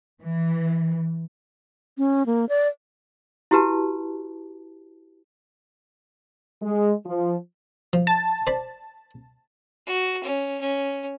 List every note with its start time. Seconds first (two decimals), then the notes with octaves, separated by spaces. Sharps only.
0.22 E3
1.98 C#4
2.26 A#3
2.49 D5
3.51 E4 F#4 G4 B4 A5
6.62 G#3
7.06 F3
7.93 F3
8.07 A5
8.47 C5 D5 B5
9.86 F#4
10.23 C#4
10.60 C#4